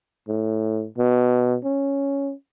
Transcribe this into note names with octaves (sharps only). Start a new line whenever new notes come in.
A2
B2
C#4